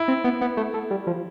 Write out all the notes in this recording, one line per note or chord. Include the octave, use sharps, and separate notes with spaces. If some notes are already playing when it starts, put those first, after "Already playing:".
Already playing: E4
C4
B3
B3
A3
A3
G3
F3